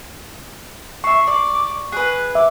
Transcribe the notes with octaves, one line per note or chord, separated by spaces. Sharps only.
E5 A5 C#6 C7
D5 D6
G#4 B4 F#6
E5 D6